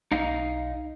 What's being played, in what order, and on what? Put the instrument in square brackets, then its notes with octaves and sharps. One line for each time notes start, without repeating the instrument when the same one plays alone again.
[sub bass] B1 [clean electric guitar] D#4 D#5 F5